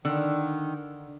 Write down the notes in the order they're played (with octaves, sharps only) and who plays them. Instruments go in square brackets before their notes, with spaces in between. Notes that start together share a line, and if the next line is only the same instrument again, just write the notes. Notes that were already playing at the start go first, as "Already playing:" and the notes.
[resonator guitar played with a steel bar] D3 [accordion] D#3